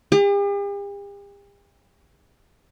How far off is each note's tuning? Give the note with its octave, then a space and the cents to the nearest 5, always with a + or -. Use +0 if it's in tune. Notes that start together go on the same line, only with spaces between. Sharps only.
G4 +45